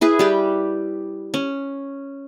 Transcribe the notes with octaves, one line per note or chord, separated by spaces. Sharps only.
E4 G#4 B4
G3 G4 B4
C#4